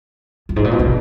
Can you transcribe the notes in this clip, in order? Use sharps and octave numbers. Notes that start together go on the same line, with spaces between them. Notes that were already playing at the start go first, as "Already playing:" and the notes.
F#2
G#2
A#2
B2
C#3